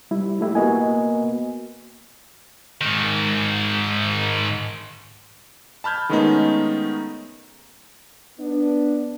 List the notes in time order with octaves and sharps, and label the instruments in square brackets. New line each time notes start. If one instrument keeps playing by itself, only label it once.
[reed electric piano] G3 E4
A3 E4 G4
[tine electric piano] A#3 B3 F#4 [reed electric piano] A#4 D#5 G#5
[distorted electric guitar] G#2 D#3
[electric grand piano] A5 B5 F6 G6 G#6
D#3 G#3 A3 B3 C#4 D#4
[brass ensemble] B3 D4